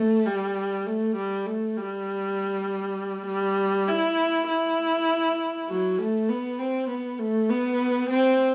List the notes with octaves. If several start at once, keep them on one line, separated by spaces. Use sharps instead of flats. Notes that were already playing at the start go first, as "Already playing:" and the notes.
Already playing: A3
G3
A3
G3
A3
G3
G3
E4
E4
F#3
A3
B3
C4
B3
A3
B3
C4